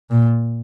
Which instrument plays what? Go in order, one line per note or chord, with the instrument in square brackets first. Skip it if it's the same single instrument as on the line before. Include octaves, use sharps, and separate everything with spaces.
[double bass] A#2